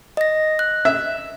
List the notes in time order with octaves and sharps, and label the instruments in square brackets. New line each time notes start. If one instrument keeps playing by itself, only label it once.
[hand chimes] D#5 A#6
F#6
[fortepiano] E5